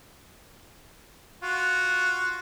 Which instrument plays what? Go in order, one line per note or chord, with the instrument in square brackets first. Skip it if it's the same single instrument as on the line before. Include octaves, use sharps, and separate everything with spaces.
[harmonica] F4 F#4